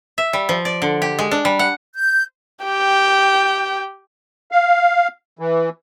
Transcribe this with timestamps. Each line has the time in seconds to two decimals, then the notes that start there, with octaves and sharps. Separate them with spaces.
0.18 E5
0.33 G3
0.49 F3
0.65 D5
0.82 D3
1.02 G4
1.19 G#3
1.31 D4
1.45 G3
1.59 F#5
1.95 G6
2.64 G4 G5
4.51 F5
5.39 E3